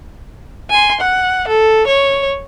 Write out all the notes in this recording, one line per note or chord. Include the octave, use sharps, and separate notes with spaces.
G#5 C6
F#5
A4
C#5